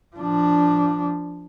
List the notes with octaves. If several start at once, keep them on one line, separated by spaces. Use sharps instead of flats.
F3 D4